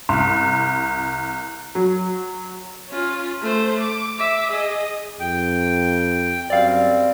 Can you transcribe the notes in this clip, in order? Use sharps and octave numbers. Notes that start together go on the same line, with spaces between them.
C2
F#3
C#4 F4
A3 C5
D6
E5 D6
G#4 D#5
F2 G5
F#2 G3 C4 D5 F5